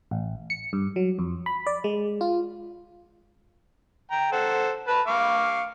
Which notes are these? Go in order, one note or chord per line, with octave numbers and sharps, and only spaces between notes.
A1
C#7
G2
F#3
F2
B5
D5
G#3
F4
G5 A#5
A4 C5 F#5
B4 A5 B5
F5 C#6 D6